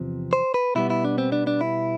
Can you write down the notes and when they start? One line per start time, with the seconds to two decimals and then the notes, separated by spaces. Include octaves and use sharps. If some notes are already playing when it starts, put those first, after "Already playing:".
Already playing: E2 C3 F3 C4
0.33 C5
0.54 B4
0.75 B2 G3 B3 E4
0.90 E4
1.05 D4
1.18 C4
1.32 D4
1.47 D4
1.61 E4